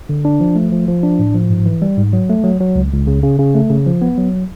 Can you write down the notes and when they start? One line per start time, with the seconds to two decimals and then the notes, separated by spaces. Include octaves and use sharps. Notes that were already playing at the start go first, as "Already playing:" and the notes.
0.09 D3
0.25 D4
0.40 F3
0.55 A3
0.72 F3
0.88 F3
1.03 D4
1.19 A2
1.34 F3
1.50 G#2
1.66 E3
1.82 G3
1.97 G#2
2.13 F#3
2.29 A3
2.44 F#3
2.60 F#3
2.75 C#2
2.92 C#2
3.07 C#3
3.23 C#3
3.39 C#3
3.55 A3
3.70 C#3
3.86 F3
4.02 B3
4.18 F#3